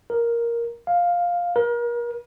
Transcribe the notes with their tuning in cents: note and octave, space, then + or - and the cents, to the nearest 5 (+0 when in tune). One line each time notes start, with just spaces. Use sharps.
A#4 +5
F5 +5
A#4 +35